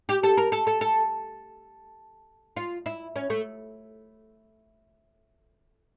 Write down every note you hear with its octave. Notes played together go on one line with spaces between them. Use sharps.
G4
A4
A#4
A4
A4
A4
F4
E4
C#4
A3